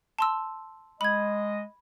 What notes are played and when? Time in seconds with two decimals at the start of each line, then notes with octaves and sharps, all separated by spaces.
0.19 A5 C6 E6
1.01 G#3 D#5 B5 G#6